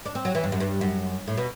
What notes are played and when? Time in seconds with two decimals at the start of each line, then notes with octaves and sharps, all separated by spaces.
0.06 D4
0.15 C4
0.25 F#3
0.35 E3
0.44 G2
0.52 F#2
0.60 G2
0.81 F#2
1.27 A2
1.37 B2